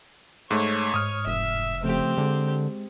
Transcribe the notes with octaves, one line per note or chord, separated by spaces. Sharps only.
G#2 A3 C#5
G#2 D#6 F6
F1 E5
C#3 F3 A3 C4 G4
D3 G#3